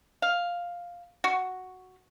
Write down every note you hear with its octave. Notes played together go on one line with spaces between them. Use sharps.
F5
F#4